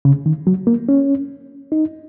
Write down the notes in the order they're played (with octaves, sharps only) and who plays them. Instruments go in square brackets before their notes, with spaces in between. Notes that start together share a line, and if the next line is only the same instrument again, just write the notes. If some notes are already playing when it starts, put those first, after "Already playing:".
[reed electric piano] C#3
D#3
F#3
A#3
C#4
D#4